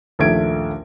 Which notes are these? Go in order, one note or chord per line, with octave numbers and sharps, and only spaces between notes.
A#1 D#2 A3 E5 G#6 D7